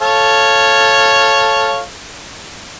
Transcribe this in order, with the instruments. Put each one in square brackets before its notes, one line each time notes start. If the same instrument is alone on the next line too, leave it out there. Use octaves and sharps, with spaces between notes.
[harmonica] A4 C#5 F5